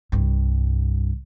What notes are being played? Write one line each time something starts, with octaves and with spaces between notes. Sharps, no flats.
C2 G2